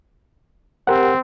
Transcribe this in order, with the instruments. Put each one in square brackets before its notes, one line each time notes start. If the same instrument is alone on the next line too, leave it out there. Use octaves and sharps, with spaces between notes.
[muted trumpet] C4 [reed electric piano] G4 A#4 F#5